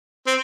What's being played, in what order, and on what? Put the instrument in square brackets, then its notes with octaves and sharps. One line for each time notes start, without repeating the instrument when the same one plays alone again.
[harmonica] C4